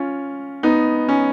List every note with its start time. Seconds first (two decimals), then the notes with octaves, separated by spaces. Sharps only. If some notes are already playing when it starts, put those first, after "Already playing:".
Already playing: C#4 F4
0.63 B3 D#4
1.09 C#4